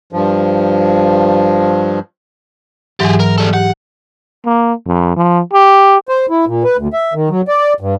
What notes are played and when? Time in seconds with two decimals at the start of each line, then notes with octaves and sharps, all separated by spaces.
0.13 G2 F3
3.00 G#2 E3 F#3 G4 G#4
3.20 A#4
3.38 G3 A4
3.53 G4 F#5
4.45 A#3
4.87 F2
5.17 F3
5.53 G4
6.09 C5
6.30 E4
6.47 A#2
6.64 B4
6.77 D2
6.93 E5
7.14 D#3
7.30 F#3
7.48 D5
7.80 G2